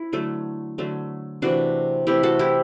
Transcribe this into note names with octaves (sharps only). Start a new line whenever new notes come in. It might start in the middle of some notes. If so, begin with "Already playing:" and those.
Already playing: E4
D3 F#3 A3
D3 F#3 A3
C3 E3 A3 D4 F#4
C3 E3 A3 E4 G4
F#4 A4
E4 G4